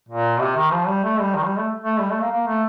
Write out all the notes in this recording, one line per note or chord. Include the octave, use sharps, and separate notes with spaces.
A#2
C3
D#3
F3
G3
A3
G3
D#3
G3
A3
A3
G3
A3
A#3
A#3
A3